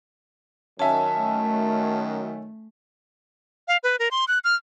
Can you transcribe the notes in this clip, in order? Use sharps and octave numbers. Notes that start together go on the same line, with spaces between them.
F#2 D#3 C#4 E5 G#5 A5
A3
F5
B4
A#4
C6
F#6
F6